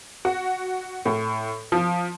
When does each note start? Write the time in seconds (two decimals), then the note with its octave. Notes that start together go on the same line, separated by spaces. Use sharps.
0.25 F#4
1.06 A2
1.72 F3